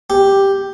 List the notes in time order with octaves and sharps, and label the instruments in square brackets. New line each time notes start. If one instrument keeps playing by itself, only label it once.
[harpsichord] G4